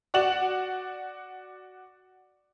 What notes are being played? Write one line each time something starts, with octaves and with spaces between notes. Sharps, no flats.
F#4 D5 F#5 E7 F#7